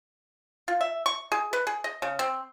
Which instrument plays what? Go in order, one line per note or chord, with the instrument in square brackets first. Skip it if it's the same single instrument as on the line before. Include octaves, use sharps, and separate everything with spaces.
[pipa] F4
E5
C#6
G#4
B4
G#4
D#5
C#3
C4